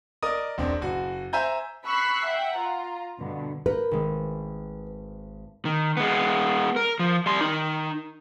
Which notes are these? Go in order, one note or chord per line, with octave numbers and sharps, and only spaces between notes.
A#4 D5 D#5 D#6
E1 C4 D4
F#1 F#4
C5 E5 G#5 A#5 G6
B5 C#6 E6 F#6 B6 C7
E5 F#5 G5
F4 A#5
G2 B2 D3
A#4 B4 G6
G#1 G#3
D#3
G#3 B3
A#4
F3
G3 C6
D#4 A#4